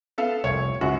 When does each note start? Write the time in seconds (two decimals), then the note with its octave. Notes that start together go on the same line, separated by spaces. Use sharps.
0.18 B3 A4 F5
0.44 F1 C2 C#5
0.81 C#2 F#2 F#4